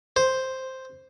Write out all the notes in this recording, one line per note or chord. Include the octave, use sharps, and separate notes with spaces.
C5